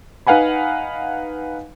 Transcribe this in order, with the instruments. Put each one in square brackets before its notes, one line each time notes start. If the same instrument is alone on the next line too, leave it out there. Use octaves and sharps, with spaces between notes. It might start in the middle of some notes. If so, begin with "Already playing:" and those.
[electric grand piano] D#4 B4 F5 F#5 G#5 B5